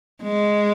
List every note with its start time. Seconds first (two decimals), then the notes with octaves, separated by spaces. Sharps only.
0.23 G#3